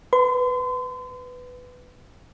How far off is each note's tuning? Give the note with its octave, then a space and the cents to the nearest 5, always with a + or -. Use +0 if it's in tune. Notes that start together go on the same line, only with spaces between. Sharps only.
B4 +10 C6 -40